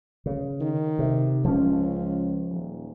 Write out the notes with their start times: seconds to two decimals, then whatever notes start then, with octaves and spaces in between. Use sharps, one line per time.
0.26 C#3
0.60 D#3
0.99 C3
1.45 C#2 F3 C#4
2.49 D#1